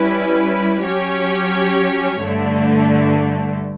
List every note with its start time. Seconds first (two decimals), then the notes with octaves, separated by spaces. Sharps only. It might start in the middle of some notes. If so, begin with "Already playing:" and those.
Already playing: G3 C#4 E4 B4
0.85 F#3 C#4 G4 C#5
2.20 G2 D3 A3